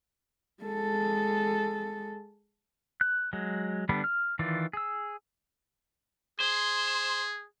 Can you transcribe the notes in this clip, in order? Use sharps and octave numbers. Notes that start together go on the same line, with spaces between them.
G#3 A4
F#6
F#3 G#3
D3 G3 B3 D4 B5
F6
D#3 E3 F4 D5
G#4 E6
G#4 C5